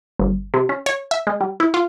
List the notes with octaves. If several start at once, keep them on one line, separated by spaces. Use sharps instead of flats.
G1
C3
C#4
C#5
E5
G#3
G3
E4
F4